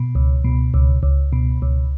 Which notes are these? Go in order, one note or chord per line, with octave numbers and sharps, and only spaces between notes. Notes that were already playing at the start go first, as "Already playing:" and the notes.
Already playing: B2
C#2
B2
C#2
C#2
B2
C#2